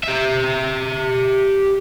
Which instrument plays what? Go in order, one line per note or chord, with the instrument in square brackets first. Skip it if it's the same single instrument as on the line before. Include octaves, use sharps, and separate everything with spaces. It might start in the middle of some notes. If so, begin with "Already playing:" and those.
[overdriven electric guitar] G4 E5